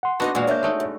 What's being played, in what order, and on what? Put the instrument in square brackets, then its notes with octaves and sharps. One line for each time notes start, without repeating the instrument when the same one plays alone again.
[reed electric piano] F#5 C6
[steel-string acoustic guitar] A3 D#4 D#5 [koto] B3 D4 F#4
[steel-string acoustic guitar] E2 A#2 [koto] G#3 F#4 F5
[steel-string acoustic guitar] G#2 A#3 D4 [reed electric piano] C#5 E5 G6
[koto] G#3 A3 D#4
[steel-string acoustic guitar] F#2